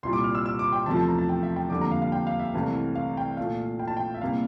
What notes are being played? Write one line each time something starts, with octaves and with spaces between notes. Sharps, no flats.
C2 A#2 G3 C6
D6
F6
E6
E6
D6
G5
E2 C3 F3 A3 A5
A5
A#5
A5
G5
E5
G5
F2 D3 G3 A#3 D6
A#5
F5
F5
G5
F5
E5
C2 C3 E3 A3 F5
F5
G5
A#2 A3 F5
G5
A5
G5
E5
C2 C3 G3 A#3 F5